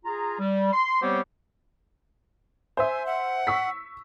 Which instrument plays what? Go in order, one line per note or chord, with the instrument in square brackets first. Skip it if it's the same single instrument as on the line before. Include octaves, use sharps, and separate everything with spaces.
[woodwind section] F4 G#4 A#5
G3
C6
G3 B3 C4 G4 C5 C#5
[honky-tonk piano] C5 E5 [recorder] G#5
[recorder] F#5
[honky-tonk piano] C#6 E6 B6